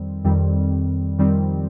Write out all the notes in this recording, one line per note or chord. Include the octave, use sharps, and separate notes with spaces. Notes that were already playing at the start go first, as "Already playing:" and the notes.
Already playing: F2 D#3 G3 C4
F2 D#3 G3 C4
F2 D#3 G3 C4